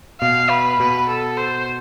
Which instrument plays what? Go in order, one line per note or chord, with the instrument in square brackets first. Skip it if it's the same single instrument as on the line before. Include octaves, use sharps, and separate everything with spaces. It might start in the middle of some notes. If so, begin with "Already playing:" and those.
[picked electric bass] B2 [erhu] F5
[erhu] B4
[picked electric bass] B2 [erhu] B4
[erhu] A4
C5